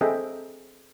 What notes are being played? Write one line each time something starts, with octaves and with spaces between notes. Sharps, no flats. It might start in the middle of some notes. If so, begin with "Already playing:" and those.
C4 G#4 A4 D#5 E5 G5